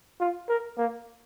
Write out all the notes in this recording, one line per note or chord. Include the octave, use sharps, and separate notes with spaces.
F4
A#4
A#3